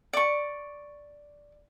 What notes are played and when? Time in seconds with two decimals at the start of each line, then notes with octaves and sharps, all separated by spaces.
0.13 D5 C#6